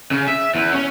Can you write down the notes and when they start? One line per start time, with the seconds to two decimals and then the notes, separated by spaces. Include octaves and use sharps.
0.11 C#3
0.28 E5
0.55 E2
0.73 C#4